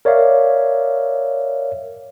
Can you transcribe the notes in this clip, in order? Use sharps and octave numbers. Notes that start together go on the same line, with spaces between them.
A#4 C#5 D5 E5 F5